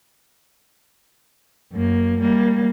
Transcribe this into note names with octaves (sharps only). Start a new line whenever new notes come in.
F#2 A#3
G3 A#3